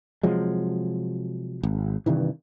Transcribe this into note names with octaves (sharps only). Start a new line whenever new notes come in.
C3 F3 F#3 G#3
G#1
G2 C3 D#3 E3